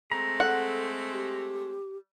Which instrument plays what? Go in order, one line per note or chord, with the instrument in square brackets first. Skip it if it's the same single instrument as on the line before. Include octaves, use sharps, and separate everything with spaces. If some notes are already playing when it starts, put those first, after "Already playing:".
[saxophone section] G#3 A3 C4 [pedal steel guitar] A#5
[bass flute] A4 [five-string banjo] F#5
[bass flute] G4